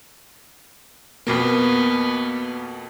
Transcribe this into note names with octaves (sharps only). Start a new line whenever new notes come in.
F2 B2 A#3 B3